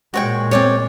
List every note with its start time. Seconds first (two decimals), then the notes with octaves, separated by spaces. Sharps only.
0.14 A#2 G#3 F#4 C#5 G5
0.51 C4 C#5 D5 G#5